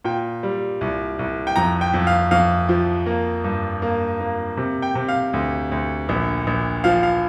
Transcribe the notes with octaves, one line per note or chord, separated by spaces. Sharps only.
A#2 G5
G3
C2
C2
G5
F2 A#5
G5
F2
F5
F2 F5
F3
A#3
G2
A#3
A#3
C3
G5
C3
F5
D2
D2
A#1
A#1
F3 F5
F5